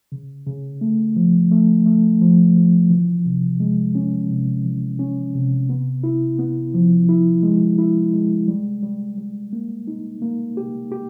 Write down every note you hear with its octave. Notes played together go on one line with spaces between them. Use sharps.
C#3
C#3
A3
F3
A3
A3
F3
F3
E3
C3
G#3
C#4
C3
E3
C#4
C3
B3
E4
B3
F3
E4
G#3
E4
G#3
G3
G3
G3
A#3
D#4
A#3
G4
G4